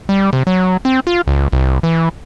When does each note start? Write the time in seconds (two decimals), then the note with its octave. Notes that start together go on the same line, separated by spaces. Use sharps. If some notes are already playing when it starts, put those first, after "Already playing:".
0.09 G3
0.33 C3
0.47 F#3
0.85 C4
1.07 F4
1.27 C#2
1.52 C2
1.83 E3